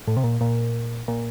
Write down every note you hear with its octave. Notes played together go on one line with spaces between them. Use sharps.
A2
C3
A#2
A#2
A#2